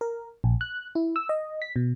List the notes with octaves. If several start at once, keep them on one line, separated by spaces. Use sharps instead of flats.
A#4
A#1
F#6
E4
E6
D#5
B6
B2